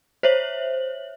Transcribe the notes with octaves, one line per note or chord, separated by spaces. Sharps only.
C5 C#5 E5 F#7